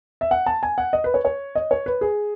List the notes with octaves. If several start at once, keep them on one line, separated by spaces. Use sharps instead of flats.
E5
F#5
A5
G#5
F#5
D#5
B4
C#5
C#5
D#5
C#5
B4
G#4